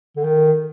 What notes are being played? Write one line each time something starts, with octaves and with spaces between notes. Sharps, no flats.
D3
D#3